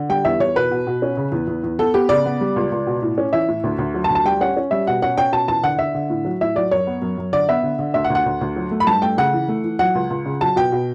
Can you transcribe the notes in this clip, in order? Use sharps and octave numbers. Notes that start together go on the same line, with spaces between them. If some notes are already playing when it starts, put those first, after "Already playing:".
Already playing: D3
G3 G5
E2 E5
E2 C#5
B2 B4
B2
B2
C#4
C#3
E2
E2
E2
B3 A4
B3 G4
C#3 D5
B3
G3
C#2
C#2
B2
A2
C#4
E3 E5
A2
D2
D2
F#3
A5
D2
A5
G3 G5
C#4 F#5
C#4
G3 E5
B2 F#5
C#4 F#5
C#4 G5
B2 A5
E2 A5
D3 F#5
D3 E5
D3
A2
F#3
A2 E5
F#3 D5
F#2 C#5
B3
F#2
F#2
D3 D5
B3 E5
D3
D3
D2 E5
F#5
D2
F#5
D2
D2
F#3
A3
B5
G2 A5
A3 G5
C#3 F#5
E3
A3
E3
F#3 F#5
C#2
C#2
C#3
F#3 A5
B2 G5
B2